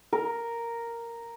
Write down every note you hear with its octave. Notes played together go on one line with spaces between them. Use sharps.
A#4